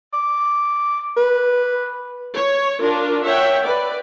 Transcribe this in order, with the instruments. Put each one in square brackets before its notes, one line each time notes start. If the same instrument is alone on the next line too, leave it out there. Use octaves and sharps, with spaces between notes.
[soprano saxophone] D6
B4
[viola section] C#5
D4 F4 A#4
C#5 E5 F#5 G5
B4 D5